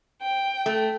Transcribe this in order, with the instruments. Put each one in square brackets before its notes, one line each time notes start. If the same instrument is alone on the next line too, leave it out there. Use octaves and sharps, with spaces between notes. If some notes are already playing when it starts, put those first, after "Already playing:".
[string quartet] G5
[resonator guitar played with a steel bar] A3